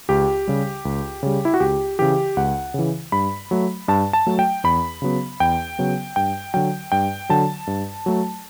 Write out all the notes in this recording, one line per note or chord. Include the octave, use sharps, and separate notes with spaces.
C#2 G4
C#3 G3
C#2
C#3 G3
E4
F#4
C#2 G4
C#3 E3 G4
C#2 F#5
C#3 E3
G2 B5
F#3 A3
G2 A5
A5
F#3 A3
G5
E2 B5
C#3 F#3 B3
E2 G5
C#3 F#3 B3
G2 G5
D3 F#3 G5
G2 G5
D3 F#3 A5
G2
F#3 A3